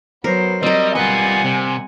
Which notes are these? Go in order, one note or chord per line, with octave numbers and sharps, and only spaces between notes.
F#3 B3 A#4 C5
G3 C4 A#4 D#5
G3 F4 B4 D#5 F#5 G#5
C3